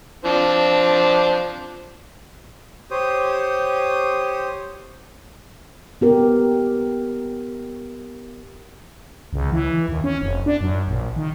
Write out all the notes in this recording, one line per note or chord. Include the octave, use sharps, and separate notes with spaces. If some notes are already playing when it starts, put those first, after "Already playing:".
F3 C4 D4
G4 C5 C#5 D#6
B3 G4 A#4
C#2
E3
D#2
C#4
F1
D4
F#2
A#1
D#3